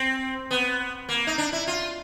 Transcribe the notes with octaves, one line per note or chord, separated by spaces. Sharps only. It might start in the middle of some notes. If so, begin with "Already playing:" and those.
Already playing: C4
B3
A#3
D#4
D4
E4
F4